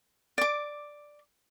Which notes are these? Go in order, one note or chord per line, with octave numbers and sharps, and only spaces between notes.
D5 D6